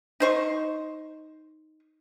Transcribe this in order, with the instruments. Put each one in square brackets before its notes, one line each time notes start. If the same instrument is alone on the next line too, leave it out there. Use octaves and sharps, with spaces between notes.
[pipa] D#4 C5 C#6